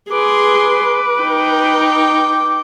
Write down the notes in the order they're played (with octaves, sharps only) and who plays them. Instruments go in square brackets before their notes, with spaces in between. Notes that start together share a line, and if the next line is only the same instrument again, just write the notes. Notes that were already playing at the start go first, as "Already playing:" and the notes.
[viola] G#4 C6 [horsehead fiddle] B4 [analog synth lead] D6
[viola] D#4 G5